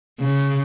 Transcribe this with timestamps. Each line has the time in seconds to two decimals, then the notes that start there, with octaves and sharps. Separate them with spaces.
0.20 C#3